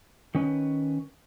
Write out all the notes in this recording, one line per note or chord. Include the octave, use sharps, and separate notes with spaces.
D#3 C#4 B4